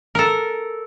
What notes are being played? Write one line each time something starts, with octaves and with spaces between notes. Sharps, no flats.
A4 A#4